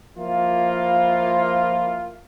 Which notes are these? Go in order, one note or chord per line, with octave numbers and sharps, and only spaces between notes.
F3 A#3 E4 F4